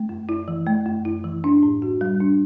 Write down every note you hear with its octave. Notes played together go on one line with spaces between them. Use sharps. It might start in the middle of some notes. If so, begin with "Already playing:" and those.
Already playing: A3
F#2
E4
E3
A3
F#2
E4
E3
D4
A2
F#4
G3
D4